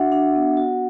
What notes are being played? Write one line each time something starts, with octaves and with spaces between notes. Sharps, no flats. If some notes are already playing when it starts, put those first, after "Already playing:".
Already playing: D4 F#4 E5 F#5
D4
B3
F#4